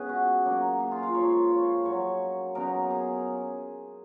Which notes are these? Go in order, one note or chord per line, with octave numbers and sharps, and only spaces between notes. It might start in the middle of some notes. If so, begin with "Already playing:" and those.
Already playing: C#3 G#3 B3 C#4 G#4 B4
F#4
C#3 F#3 A#3 D#4
G#4
F4
F4
F3 G#3 D#4 C#5
C#5
C#3 F#3 C#4 C#5
C#3 F#3 B3 D#4 A#4
G#4